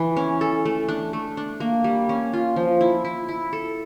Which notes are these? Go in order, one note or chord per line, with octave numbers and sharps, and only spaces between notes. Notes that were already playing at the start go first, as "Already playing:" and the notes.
Already playing: E3
C#4
A4
A3
D4
A3
D4
A#3
G3
C#4
F4
F3
E4
E4
E4
A4